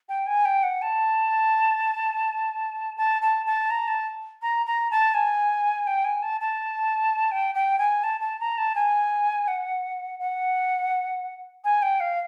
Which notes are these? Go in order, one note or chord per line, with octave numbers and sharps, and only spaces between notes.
G5
G#5
G5
F#5
A5
A5
A5
A5
A#5
A5
A#5
A#5
A5
G#5
G5
G#5
A5
A5
G5
G5
G#5
A5
A5
A#5
A5
G#5
F#5
F#5
G#5
G5
F5